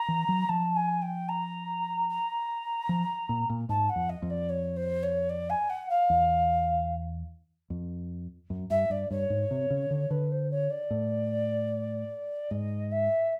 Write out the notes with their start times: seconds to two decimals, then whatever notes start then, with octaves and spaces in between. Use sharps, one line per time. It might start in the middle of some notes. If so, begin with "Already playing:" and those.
Already playing: A#5
0.08 E3
0.29 F#3
0.48 F3 A5
0.76 G#5
1.02 G5
1.28 A#5
2.09 A#5
2.89 F3
3.29 A#2
3.50 A#2
3.69 G#2 A5
3.89 F#5
3.96 F2
4.09 D#5
4.22 F2
4.30 D5
4.49 C#5
4.76 C5
5.03 C#5
5.29 D5
5.49 G#5
5.69 F#5
5.89 F5
6.10 E2
7.70 F2
8.50 F#2
8.70 G2 E5
8.90 G2 D5
9.11 G2 C#5
9.30 G#2
9.51 C3
9.70 C#3
9.90 D3
10.10 D3 B4
10.31 C5
10.51 C#5
10.70 D5
10.90 A2
12.50 G#2 D#5
12.91 E5